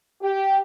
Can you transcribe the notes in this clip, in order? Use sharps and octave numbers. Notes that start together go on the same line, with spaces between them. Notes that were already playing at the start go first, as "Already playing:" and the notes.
G4